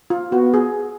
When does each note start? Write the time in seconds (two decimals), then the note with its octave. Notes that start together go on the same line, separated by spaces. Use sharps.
0.10 F4
0.32 B3 F#4
0.54 G#4